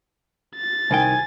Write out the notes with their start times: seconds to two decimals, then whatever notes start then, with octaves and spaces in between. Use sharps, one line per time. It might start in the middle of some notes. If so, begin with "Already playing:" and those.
0.56 A6
0.91 C2 D#3 G5 G#5